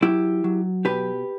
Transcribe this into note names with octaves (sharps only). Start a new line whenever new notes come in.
F#3 E4 G4
F#3
B2 G4 B4